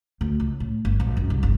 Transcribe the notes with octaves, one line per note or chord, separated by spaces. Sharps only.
D2
C#2
A2
G1
A#1
F#2
C2
G1